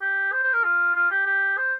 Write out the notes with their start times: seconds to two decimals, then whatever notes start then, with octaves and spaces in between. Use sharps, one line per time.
0.01 G4
0.33 C5
0.43 C5
0.53 A#4
0.64 F4
0.95 F4
1.11 G4
1.26 G4
1.58 C5